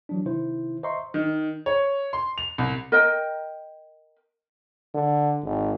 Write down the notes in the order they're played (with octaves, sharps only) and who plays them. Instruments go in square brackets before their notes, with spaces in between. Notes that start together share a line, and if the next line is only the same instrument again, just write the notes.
[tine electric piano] E3 F#3 D4
C3 D#3 E4 C5
C5 D#5 E5 A#5 C6 C#6
[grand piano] D#3
C#5
C6
F7
C2
[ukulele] A#4 D#5 G5
[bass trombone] D3
G#1